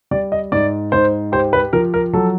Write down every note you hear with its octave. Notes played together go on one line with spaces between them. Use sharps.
G3 D5
D#5
G#2 D5
G#2 C5
G4 C5
B4
F3 A#4
A#4
F#3 A4